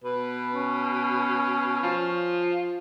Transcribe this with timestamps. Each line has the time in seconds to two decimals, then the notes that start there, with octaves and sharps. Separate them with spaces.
0.04 B2 B4
0.55 C#4
1.83 F3